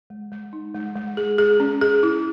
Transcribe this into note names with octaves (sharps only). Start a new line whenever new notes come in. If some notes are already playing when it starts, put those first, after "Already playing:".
G#3
G#3
D#4
G#3
G#3
G#4
G#4
C#4
G#4
E4